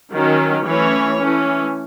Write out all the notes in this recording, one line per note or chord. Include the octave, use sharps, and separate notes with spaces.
D#3 F#3 C#4
E3 A3 C#4 C#5
E3 A3 C#4